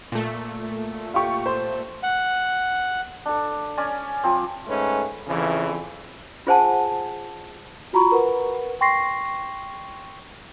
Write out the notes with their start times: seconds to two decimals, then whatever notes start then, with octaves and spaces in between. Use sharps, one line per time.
0.12 A#2 A3
1.14 F4 G4 C#6
1.46 C5
2.03 F#5
3.26 D4 A4
3.78 C#4 C#5 D5 G#5
4.24 F3 C4
4.68 G#2 A3 C#4 B4
5.27 F2 C#3 E3
6.47 F4 G#4 C5 F#5 G#5 A5
7.93 F4 F#4 A#5 B5 C#6
8.12 A#4 B4 F#5
8.81 G5 C6 C#6 A#6 C7